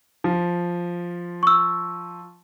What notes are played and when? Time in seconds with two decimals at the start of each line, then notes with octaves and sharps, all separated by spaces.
0.24 F3
1.43 C#6 E6